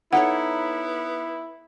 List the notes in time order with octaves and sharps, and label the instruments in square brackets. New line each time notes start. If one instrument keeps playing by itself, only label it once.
[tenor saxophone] B3 [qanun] D#4 A4 C#5 [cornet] E4 [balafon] F#5